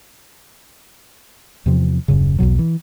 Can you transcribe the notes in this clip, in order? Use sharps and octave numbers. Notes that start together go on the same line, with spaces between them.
E2 C3 F3
D#1 F#2 C#3
B1 E2 B2 F#3
E3